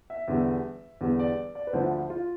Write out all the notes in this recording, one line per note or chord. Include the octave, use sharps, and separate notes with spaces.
E5
E2 D3 G3
E2 D3 G3
D5
D5
B4
D2 D3 F3 C5
F4